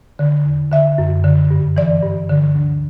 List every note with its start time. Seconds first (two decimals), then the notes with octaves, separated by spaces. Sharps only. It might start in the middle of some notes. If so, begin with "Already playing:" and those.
0.19 D3
0.45 E2
0.72 D3 E5
0.98 F#2
1.24 D3
1.51 G2
1.77 E3 D5
2.03 G2
2.29 D3
2.56 D2